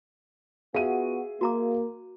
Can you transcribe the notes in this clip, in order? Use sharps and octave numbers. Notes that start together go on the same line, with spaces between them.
B3 F4 F#4 G#4 E5 F5 D#7
A#3 F#4 A#5 D6